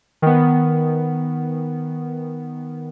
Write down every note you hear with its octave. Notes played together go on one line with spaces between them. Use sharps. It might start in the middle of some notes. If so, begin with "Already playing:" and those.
D#3 B3